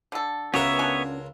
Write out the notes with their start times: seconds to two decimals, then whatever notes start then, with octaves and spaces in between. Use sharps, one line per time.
0.12 D3 A4
0.54 C#2 B3 C#4 F4 F#4 A#4 C#5 E5
0.79 D4 F#4 G#5